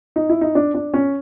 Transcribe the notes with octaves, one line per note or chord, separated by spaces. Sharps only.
D#4
E4
D#4
D4
D4
C#4